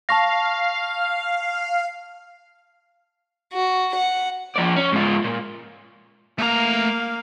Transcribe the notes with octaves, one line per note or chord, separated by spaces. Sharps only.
F5 A5 C#6 A#6
F#4
F#5
F3 D5
C#4
G#2 F4
A#2
A3 A#3 F5 A#5